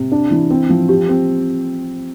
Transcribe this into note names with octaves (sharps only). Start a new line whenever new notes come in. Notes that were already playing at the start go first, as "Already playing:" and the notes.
Already playing: C3
D4
E3
C4
F3
G4
C4